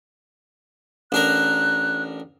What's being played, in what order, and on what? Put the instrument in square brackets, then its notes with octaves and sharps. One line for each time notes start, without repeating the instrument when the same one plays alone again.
[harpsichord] A1 D4 A#4 [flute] F#6